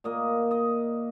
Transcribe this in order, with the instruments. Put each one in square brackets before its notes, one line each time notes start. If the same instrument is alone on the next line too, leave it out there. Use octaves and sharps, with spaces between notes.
[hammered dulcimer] A#2 A#3 D#5
D#5